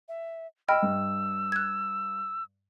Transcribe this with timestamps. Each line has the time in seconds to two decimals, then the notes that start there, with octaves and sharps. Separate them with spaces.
0.08 E5
0.68 D#5 G5 B5 E6 F6
0.83 G2
1.52 F#6 G#6